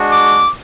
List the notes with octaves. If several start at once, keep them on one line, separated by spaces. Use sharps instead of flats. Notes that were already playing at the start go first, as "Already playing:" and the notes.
Already playing: G#3 D4 F#4
D6